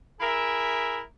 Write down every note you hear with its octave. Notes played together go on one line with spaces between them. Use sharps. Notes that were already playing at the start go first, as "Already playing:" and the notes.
E4 G#4 A#4 E5